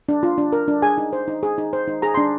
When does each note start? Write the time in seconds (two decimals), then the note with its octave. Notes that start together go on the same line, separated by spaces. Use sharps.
0.09 D4
0.23 F4
0.38 D4
0.52 A#4
0.68 D4
0.82 G#4 G#5
0.98 D#4
1.13 C5
1.28 D#4
1.43 G#4
1.58 D#4
1.73 C5
1.88 D#4
2.02 G#4 A#5
2.14 D4 C6